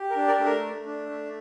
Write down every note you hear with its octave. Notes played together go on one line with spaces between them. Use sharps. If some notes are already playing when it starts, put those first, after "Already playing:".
Already playing: G4
A#4
D4
A#4 D5
A3
A#4
A3
D4
A3